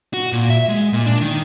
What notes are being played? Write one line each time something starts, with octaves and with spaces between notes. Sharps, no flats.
F#4
A#2
E5
G#3
A#2
D4
D#3